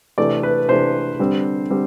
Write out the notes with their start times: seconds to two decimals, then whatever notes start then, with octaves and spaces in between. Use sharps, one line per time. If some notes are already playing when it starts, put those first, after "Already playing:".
0.18 C3 E3 A3 D4 D5
0.43 B4
0.68 C3 E3 A3 D4 C5
1.19 D3 G3 C4
1.70 D3 G3 C4